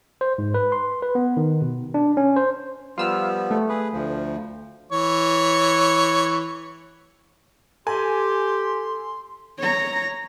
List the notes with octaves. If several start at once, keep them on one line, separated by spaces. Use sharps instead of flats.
C5
G#2
B4
C6
B4
B3
D#3
B2
D4
C#4
C5
F3 G3 B3 F4 E6 F6
A3
G#4 B4
D2 F3
E3 C#5
G4 A4 G#5 C6
C#5 A#5